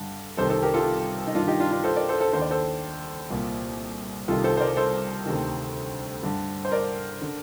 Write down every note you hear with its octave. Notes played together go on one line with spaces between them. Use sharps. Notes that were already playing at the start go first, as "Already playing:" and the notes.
Already playing: G2 D3
C2 C3 D#3 A4 C5
A4 C5
G4 A#4
F4 A4
D#4
G2 D#3 D4 F4
D#4 G4
D4 F4
D4 F4
A4 C5
A#4 D5
A4 C5
A4 C5
D#2 D3 C5
D5
A4 C5
C2 A#2
C2 C3 D#3 F4 A4
A4 C5
C5
A#4 D5
A4 C5
D2 C3 D#3
G2 D3
C5
A#4 D5
D3